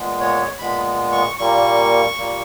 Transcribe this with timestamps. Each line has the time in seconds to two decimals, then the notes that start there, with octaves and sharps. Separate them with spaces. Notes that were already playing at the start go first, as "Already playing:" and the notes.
Already playing: A#2 G#3 B3
0.20 C#5
0.59 A#2 G#3 B3 B5
1.12 C#6
1.39 A#2 G3 A#3 C#6
2.18 A#2 G3 A#3